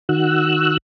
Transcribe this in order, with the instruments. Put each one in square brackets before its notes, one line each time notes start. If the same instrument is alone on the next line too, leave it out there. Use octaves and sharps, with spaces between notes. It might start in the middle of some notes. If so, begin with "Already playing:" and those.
[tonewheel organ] D#3 F#4 E6 F#6